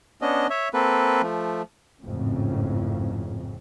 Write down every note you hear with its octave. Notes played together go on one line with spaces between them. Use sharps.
B3 C#4 D4 D#5
C#5 E5
A#3 C4 A4 B4
F3 A3
G#1 F2 A2 C#3